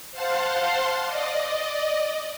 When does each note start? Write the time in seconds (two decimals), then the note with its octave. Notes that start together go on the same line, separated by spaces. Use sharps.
0.12 C5 F5 F#5 A5 C6
1.03 D5 D#5